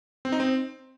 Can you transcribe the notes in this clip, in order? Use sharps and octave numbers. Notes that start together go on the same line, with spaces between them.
C4
D#4
C4